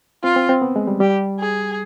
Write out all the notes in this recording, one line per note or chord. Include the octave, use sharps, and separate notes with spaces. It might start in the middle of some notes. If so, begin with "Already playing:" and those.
C4 F4
C4
C4
B3
G#3
G3
G3 G4
G#4